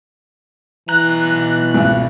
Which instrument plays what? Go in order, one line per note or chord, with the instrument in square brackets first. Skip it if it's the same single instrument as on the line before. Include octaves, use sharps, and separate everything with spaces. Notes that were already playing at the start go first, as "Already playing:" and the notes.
[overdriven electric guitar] B2 A#5 [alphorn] E3 [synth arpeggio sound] F#6
[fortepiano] G#1 C#2